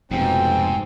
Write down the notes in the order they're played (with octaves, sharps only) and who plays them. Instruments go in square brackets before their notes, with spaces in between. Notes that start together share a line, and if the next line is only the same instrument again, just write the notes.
[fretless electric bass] F1 F2 B2 [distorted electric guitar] G#2 [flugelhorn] C4 [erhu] G5